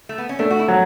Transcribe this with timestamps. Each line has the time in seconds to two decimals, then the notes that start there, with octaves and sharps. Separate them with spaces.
0.09 A3
0.18 B3
0.29 C#4
0.39 A3 D4
0.51 F#4
0.59 E4
0.68 F#3